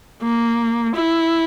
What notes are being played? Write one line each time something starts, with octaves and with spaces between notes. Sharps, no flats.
A#3
E4